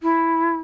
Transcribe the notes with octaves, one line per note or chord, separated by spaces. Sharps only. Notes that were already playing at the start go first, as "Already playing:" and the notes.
E4